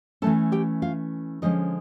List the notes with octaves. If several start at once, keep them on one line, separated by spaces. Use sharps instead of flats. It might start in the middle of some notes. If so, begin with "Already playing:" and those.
E3 A3 C#4 A4 A5
G4 G5
F4 F5
D3 F3 G#3 C#4 D#4 D#5